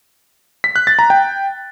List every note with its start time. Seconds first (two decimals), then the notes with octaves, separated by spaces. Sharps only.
0.64 B6
0.76 F#6
0.87 A6
0.99 A#5
1.10 G5